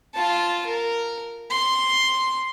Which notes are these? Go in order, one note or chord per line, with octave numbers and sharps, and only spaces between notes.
F4 A5
A#4
C6